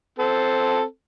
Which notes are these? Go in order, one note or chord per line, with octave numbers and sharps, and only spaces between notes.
C4 A4